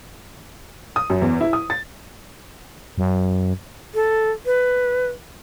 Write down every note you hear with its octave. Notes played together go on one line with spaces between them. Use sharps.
D#6
F#2
E2
E4
D#6
A6
F#2
A4
B4